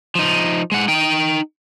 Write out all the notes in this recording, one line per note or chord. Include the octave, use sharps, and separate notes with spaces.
F3 D#4
G#3 F#5
D#4 G5